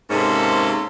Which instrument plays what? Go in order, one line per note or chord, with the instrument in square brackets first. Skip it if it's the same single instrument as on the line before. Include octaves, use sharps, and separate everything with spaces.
[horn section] G#2 C3 A#3 C#4 A4